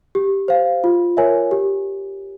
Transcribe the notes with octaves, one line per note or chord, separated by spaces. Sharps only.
G4
C5 F5
F4
A#4 C#5 E5 G#5
G4